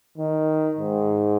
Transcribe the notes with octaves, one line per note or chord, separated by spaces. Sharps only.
D#3
G#2